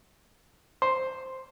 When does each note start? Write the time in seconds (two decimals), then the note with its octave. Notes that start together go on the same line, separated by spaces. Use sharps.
0.82 C5